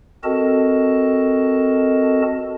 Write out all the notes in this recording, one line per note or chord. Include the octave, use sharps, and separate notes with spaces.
C4 F#4 A4 A#4 D#5 A5